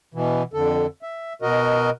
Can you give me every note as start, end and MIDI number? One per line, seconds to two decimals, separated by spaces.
0.14 0.43 47
0.14 0.43 52
0.54 0.86 41
0.54 0.86 50
0.54 0.86 69
1.03 1.33 76
1.42 1.90 47
1.42 1.90 66
1.42 1.90 70
1.42 1.90 75